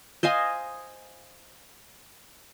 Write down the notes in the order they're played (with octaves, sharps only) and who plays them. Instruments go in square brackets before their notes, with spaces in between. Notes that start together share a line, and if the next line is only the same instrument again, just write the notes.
[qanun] C5 D#5 F5 G#5